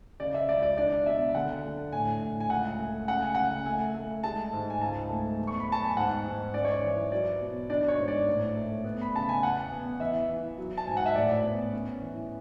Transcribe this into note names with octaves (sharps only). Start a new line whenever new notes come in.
C#3 D5
E5
C#2 D5
D5
D4 D5
B2 E5
D3 F#5
D3
A2 G#5
A2
G#5
C#2 F#5
A3
C#3 F#5
G#5
C#3 F#5
A3 G#5
A3
G#3 A5
G#2
G#5
C#2 A5
A3
E2
C#6
B5
B3 A5
G#5
G#2 F#5
G#2
C#4 D5
C#5
D5
E3
F#3 D5
B2
D4 D5
C#5
G#2
D5
A2
A3
B3
B5
C#3 A5
G#5
E2 F#5
B3
E3 E5
E3
F#3
A5
G#2 G#5
F#5
E5
A2 D5
B3
C#4
E3